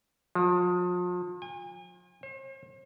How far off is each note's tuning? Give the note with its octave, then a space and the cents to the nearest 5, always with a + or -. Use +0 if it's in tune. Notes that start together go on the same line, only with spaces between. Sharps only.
F3 +35
G#5 -40
C5 +45